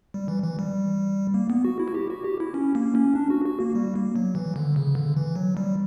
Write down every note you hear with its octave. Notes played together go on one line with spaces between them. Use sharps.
G3
E3
E3
G3
A#3
B3
F#4
E4
F#4
G4
F#4
G4
E4
C#4
A#3
C#4
D4
F#4
F#4
A#3
G3
A#3
F#3
E3
D3
C#3
D3
E3
F#3
G3